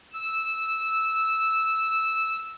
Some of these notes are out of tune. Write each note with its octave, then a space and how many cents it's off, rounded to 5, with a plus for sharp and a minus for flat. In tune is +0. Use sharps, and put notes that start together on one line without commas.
E6 -10